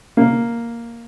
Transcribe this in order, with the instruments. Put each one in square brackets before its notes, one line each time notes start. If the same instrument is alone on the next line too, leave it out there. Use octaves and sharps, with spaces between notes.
[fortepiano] A#3